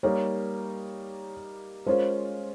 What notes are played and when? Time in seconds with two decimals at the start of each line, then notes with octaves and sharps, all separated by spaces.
0.03 G3 A#3 D#4 C#5
1.86 G#3 C#4 F4 A#4 C5